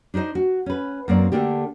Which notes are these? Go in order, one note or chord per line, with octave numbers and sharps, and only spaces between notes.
D4 D#4 G4 C5 D#5
F#4
C#4 B4
F#2 A#3 C4 D5
D3 A3 A#3 D4 G4